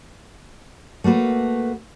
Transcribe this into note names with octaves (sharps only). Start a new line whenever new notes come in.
A3 A#3 F#4 B4